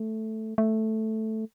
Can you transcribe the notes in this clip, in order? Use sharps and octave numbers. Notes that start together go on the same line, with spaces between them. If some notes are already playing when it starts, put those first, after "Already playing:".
Already playing: A3
A3